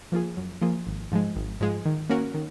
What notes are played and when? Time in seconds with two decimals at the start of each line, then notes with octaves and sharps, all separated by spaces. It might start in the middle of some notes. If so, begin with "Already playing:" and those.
0.12 F3 A#3 F4 G#4
0.37 F#2
0.62 F3 A#3 F4 G#4
0.87 G#1
1.11 G#2 F3 G#3
1.36 G#1
1.61 G#2 F3 G#3
1.85 D#3
2.09 A#3 C#4 F#4 A#4
2.34 D#3